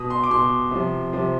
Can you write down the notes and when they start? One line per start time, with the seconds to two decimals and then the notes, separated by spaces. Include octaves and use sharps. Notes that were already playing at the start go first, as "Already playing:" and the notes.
Already playing: B2 D#6
0.10 C6
0.23 D6
0.31 B2 C6
0.71 C3 F3
1.13 C3 F3